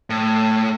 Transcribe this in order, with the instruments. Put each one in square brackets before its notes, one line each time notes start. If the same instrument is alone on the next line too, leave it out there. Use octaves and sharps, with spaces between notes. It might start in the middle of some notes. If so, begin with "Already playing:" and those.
[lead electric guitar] A2